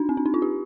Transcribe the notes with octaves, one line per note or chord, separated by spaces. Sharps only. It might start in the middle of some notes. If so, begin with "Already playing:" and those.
Already playing: D4 D#4
C4
D4
D#4
F4
G4